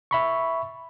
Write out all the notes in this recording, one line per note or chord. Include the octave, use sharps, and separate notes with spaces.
E5 B5 C#6